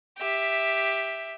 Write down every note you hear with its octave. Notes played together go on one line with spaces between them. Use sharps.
G4 E5